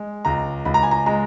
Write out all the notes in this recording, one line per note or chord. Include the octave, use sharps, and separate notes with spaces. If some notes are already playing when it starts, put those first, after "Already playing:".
Already playing: G#3
C#2 A#5
C#2 B5
A#5
G#5
A#5
G#3 A#5